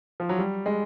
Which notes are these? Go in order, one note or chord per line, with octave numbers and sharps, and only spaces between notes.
F3
F#3
G3
G#3